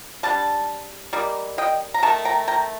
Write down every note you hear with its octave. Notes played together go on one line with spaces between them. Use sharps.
G3 D4 A5
G3 A#3 D#4
D#5 G5
A#5
D#3 A3 A5
G5 A#5
G5 A#5